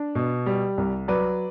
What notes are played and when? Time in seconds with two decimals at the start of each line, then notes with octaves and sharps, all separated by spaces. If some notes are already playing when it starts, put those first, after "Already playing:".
Already playing: D4
0.15 B2
0.46 G3
0.78 C2
1.08 F#3 B4 D5